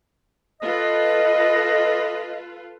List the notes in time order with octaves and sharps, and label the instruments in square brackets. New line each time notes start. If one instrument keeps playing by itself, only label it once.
[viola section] F4 A4 B4 [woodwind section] D#5